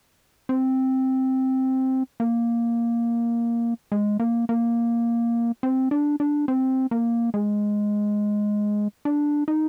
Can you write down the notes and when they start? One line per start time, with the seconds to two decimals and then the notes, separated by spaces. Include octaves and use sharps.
0.49 C4
2.20 A#3
3.92 G#3
4.20 A#3
4.49 A#3
5.63 C4
5.91 D4
6.20 D4
6.48 C4
6.91 A#3
7.34 G#3
9.05 D4
9.48 D#4